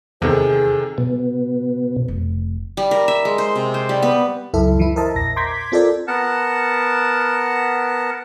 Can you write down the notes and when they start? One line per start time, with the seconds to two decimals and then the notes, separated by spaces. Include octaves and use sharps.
0.22 E2 C3 D#3 G#4 A4
0.98 B2
2.08 F1
2.77 G3
2.91 A#4
3.08 E5
3.25 G#3
3.38 C5
3.56 C3
3.74 C5
3.89 G3
4.02 B3
4.54 C#2 F#2 E4 A4 E5
4.79 E3 E4
4.96 A#4 C5 D#5 E5 A5
5.15 A#1 E2 A#6
5.36 A#5 C6 D6 G6 G#6 B6
5.72 C4 F4 A4 A#4 D5
6.07 B3 A#4 F#5 A5